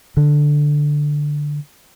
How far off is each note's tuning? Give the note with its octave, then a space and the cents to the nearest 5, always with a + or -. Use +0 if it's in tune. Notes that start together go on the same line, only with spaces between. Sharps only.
D3 +5